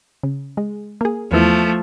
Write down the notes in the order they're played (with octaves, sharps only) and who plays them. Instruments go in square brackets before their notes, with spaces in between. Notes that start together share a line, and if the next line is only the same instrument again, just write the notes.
[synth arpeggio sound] C#3
G#3
A#3 G#4
[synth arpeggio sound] E2 B3 E4 [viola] F3 A3